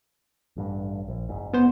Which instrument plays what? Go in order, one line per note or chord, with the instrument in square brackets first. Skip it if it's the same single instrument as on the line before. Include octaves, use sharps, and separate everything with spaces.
[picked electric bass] A1 G2
A#1
F#1 G#2
[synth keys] B3 C5